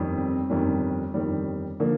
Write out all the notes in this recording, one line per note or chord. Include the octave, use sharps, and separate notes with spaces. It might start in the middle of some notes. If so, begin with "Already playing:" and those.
Already playing: G1 F2 D#3 G3
C4
G1 F2 D#3 G3
G1 F2 D#3 G3
D3 F3 A#3